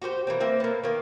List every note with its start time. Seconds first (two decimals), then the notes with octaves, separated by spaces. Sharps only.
0.02 F#4 G4 A#4 C5
0.27 E3 A#3 C4
0.40 A#3 C4 E5
0.60 A#3 B3
0.84 D#3 A#3